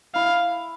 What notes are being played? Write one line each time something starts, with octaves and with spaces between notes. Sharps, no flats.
E4 F5